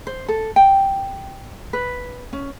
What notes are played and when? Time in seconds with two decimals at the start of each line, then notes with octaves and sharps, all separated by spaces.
0.07 C5
0.28 A4
0.56 G5
1.73 B4
2.33 C#4